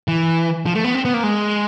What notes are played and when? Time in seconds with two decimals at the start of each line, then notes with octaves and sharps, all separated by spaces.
0.08 E3
0.66 F3
0.75 A3
0.84 B3
0.94 C4
1.05 B3
1.14 A#3
1.23 G#3